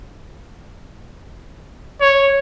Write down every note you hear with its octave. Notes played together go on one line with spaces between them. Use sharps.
C#5